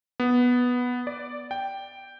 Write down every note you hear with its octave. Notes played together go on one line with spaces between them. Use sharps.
B3
D5
G5